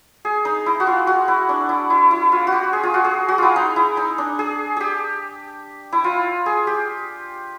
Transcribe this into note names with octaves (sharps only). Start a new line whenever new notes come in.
G#4
D#4
E4
F#4
F4
F#4
E4
D4
E4
E4
E4
F4
F#4
G4
G#4
F4
F#4
G#4
F#4
E4 F4
D#4
E4
D#4
D4
G#4
G4 G#4
E4
F4
G#4
G4